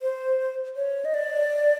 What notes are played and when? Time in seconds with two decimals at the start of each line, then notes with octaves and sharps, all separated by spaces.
0.02 C5
0.76 C#5
1.05 D#5
1.14 D5